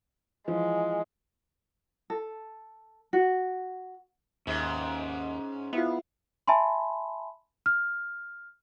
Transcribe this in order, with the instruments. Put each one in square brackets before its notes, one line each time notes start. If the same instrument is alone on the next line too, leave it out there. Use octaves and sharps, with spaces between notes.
[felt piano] E3 F3 [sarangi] G#3
[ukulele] A4
F#4
[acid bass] D#2 [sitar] G#2 [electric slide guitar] C#4 E5
[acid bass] B3 [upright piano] E4 F4
[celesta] E5 G#5 A5 B5 C6
F6